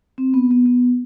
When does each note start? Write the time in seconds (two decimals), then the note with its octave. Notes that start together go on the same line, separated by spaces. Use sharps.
0.18 C4
0.34 B3
0.51 B3
0.66 B3